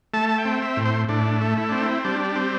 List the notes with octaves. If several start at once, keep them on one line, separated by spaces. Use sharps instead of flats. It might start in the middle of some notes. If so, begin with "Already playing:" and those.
A3 A5
A5
G5
C4
E5
A2
C5
A2 D4
A3
E4
C4 D4
E4
G3 D4
C4